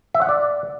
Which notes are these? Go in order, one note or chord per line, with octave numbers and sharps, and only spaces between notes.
E5
F#5
D5